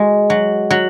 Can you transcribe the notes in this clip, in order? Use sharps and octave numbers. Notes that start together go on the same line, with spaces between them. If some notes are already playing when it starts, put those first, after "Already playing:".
Already playing: G#3 F#4
F#3
F#3